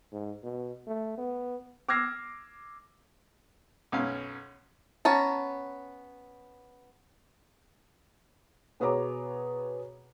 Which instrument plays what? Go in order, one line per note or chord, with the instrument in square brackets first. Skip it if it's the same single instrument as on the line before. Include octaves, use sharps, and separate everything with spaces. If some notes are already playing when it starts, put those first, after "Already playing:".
[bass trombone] G#2
B2
A3
B3
[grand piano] D6 E6 F6 G#6 A#6 C7
[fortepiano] B1 F#2 C#4 F5
[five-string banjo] B3 C#4 A5 A#5
[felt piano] B2 B3 G#4 C#5 A#5 D6